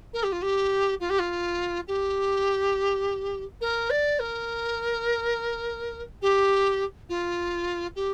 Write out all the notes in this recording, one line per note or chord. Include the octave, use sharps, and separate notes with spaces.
A#4
G4
F4
G4
F4
G4
F4
G4
A#4
D5
A#4
G4
F4
G4